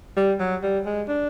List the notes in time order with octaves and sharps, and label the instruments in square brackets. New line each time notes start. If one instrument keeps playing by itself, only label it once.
[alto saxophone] G3
F#3
G3
G#3
D4